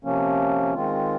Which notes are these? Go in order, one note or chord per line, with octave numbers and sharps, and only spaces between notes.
C3 F3 A#3 C#4
D#3 G#3 C4 F4